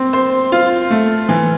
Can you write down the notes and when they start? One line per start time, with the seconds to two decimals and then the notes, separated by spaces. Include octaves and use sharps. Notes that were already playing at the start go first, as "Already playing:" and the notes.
Already playing: C4
0.13 C5
0.52 F4
0.91 A3
1.29 E3